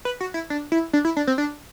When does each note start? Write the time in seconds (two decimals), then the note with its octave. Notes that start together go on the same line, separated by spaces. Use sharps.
0.05 B4
0.21 F#4
0.34 E4
0.50 D4
0.72 E4
0.93 D4
1.05 E4
1.17 D4
1.27 C4
1.38 D4